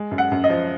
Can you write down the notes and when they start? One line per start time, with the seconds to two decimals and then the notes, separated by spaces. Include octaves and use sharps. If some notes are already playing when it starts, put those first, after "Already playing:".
Already playing: G#3
0.11 F#2
0.18 F#5
0.32 F#2
0.44 D#5
0.50 F3